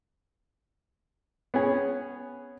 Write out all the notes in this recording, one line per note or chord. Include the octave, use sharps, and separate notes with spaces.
B3 C#4 G#4